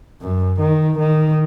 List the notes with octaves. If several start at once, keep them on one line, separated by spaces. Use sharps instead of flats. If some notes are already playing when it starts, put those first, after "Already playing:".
F#2
D#3
D#3